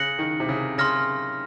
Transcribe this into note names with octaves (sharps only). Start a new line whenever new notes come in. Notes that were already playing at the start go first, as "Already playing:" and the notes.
Already playing: C#3 F#6 A#6 C#7 F#7
D#3
C3
C#3
C#3 C6 F6 A#6